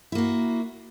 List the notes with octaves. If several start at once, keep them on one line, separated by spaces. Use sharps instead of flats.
A#3 E4 F#4